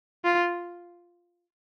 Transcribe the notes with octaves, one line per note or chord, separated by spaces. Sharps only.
F4